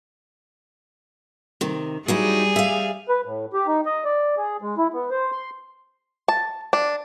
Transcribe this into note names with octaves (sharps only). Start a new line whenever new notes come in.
C3 D#3
F#3 G3 D#4 E4 G#4
E5 F5
B4
A2
G4
D#4
D#5
D5
G#4
G#3
E4
B3
C5
C6
A5
D4